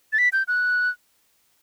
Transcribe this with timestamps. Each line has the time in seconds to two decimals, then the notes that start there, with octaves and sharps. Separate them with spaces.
0.13 A6
0.18 B6
0.33 G6
0.48 F#6